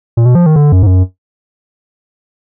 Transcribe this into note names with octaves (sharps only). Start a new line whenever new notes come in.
A#2
B2
F3
D#3
D3
F#2
G#2
F#2